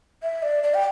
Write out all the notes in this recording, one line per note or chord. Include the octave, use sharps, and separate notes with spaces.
E5
D5
D5
G5